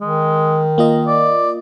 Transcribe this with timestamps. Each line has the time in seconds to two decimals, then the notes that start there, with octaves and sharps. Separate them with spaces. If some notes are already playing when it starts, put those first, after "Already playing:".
0.01 D#3 G#3
0.78 A#3 F4 D#5
1.07 D5